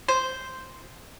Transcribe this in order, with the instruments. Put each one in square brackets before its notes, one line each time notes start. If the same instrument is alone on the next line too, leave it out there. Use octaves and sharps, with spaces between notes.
[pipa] C5